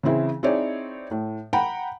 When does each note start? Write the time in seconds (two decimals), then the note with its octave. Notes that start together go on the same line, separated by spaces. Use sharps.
0.03 C#3 E3 C4 E4 G#4
0.43 C4 D#4 E4 G#4 C#5 D5
1.11 A2
1.53 F#5 G5 A#5 B5